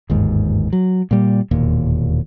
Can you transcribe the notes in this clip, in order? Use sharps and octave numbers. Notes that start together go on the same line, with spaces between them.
G1 D#2 G#2
F#3
A#2 G3
E1 D#2 A#2